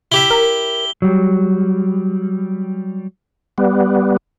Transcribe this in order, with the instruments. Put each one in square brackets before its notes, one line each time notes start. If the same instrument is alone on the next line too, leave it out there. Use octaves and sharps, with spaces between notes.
[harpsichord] E4 G4 E5 [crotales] G7
[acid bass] A#4
[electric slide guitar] F#3 G3
[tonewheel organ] G3 B3